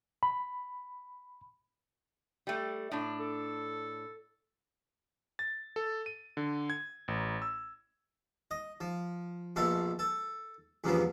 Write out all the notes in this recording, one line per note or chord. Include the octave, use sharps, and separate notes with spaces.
B5
G3 A3
A2 D4
A4
A6
A4
D#7
D3
G#6
A1
E6
D#5
F3
A#1 F2 B2 A3 A4 C6
A4
E2 G2 A#2 C#3 F3 B3